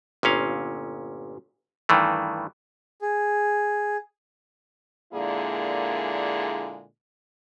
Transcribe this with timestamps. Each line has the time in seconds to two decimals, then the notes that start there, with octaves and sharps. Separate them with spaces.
0.23 G1 A#2 C#4 F5
1.89 G2 D#3 E3 A3
3.02 G#4
5.13 A#2 D3 G#3 A#3 E4 G#4